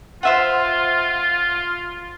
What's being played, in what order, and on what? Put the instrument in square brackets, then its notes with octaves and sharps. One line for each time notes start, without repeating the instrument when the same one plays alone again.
[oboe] F4 [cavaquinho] C5 E5 F#5